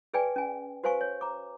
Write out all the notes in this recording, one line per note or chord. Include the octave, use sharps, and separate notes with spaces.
G#4 B4 D5 G5 G#5
C#4 G#5
F#4 B4 C5 F5 G#5 C#6
C#5
A#5 D6